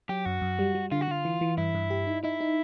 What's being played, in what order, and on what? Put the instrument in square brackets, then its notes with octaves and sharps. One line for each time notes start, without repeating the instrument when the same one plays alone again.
[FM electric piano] F#3 [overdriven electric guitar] G4
[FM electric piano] F#2 [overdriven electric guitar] F#4
[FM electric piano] F#2
G3
G3
[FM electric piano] D3 [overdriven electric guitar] F4
[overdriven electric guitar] F#4
[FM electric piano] D3 [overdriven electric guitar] F4
[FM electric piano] E3
E3
[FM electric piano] G2 [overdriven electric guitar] E4
[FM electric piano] G2
G4
D#4
[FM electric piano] D#4 [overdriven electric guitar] E4
[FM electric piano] D#4